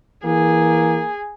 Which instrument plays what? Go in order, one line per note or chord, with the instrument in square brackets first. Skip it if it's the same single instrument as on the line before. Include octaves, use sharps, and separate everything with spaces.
[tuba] E3 [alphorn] A#3 [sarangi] G#4